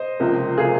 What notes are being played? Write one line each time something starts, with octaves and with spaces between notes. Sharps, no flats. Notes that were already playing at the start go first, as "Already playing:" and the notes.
Already playing: C5 D#5
C#2 C3 F3 A#3
C3 F3 A#3 F4 G#4